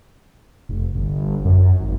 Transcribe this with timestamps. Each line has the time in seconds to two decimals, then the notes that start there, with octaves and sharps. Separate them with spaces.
0.69 F1
0.94 G1
1.45 F#2
1.80 G#1